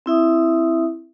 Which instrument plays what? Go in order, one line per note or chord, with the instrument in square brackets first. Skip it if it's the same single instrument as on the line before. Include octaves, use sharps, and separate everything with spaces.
[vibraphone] C4 E4 E5 D#6